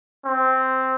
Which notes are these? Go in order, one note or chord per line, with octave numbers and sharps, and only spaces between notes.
C4